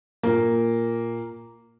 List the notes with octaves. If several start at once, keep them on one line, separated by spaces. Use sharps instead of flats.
A#2 A#3